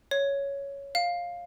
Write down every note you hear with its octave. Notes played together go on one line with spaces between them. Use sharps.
C#5
F5